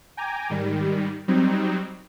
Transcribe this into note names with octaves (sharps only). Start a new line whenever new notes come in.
G5 G#5 A#5 D6
G#2 D#3 G3
F#3 G3 C4 D#4